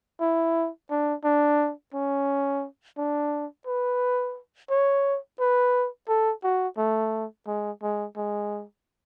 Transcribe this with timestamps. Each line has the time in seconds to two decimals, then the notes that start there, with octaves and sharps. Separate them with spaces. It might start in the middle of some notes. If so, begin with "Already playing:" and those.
0.21 E4
0.90 D4
1.24 D4
1.93 C#4
2.98 D4
3.67 B4
4.70 C#5
5.40 B4
6.09 A4
6.44 F#4
6.78 A3
7.47 G#3
7.82 G#3
8.16 G#3